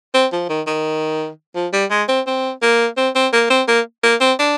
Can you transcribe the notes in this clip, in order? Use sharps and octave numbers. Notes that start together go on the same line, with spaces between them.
C4
F3
D#3
D#3
F3
G3
G#3
C4
C4
A#3
C4
C4
A#3
C4
A#3
A#3
C4
D4